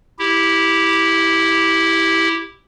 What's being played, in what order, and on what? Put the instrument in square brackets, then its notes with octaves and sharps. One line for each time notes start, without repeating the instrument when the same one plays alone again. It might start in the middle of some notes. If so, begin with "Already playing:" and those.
[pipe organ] E4 G4